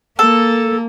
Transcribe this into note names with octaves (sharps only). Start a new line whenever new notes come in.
A#3 A4